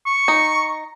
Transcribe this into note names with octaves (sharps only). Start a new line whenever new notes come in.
C#6
D#4